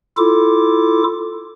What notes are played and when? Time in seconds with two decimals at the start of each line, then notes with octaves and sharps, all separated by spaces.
0.17 E4 F4 A4 D6